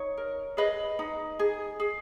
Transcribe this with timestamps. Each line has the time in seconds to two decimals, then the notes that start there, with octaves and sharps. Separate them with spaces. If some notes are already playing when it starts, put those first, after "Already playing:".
Already playing: D#4 C#5
0.17 A#4
0.57 G#4 B4 D#5
0.99 D#4
1.39 G#4
1.80 G#4